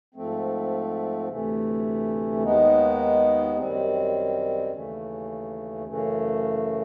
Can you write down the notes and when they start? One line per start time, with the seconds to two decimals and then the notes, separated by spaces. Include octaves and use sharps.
0.15 G#2 F3 A3 C4
1.29 D2 C3 E3 A3
2.43 D#2 D#3 G#3 B3 D#4
3.57 F#2 D#3 G3 C4
4.72 D#2 C#3 E3 A3
5.86 F#2 C#3 E3 A3